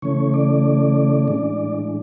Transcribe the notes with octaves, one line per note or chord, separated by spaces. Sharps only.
C#3 E3 A3 C#4 C#5
D5
A2 E3 G#3 D4